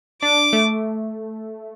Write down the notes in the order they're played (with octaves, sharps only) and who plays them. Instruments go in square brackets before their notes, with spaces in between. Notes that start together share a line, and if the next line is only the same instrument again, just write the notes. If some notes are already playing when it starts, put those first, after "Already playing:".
[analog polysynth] D4 [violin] D6
[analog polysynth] A3